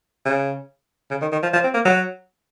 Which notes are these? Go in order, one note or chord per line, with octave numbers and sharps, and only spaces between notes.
C#3
C#3
D#3
D#3
F3
F3
C4
A#3
F#3